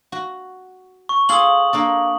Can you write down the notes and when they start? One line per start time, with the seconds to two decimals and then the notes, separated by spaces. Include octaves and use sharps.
0.12 F#4
1.09 C#6
1.29 F4 G#4 A4 D#6 F#7
1.73 A#3 D4 A4